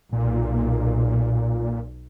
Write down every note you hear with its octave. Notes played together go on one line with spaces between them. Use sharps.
B1 A#2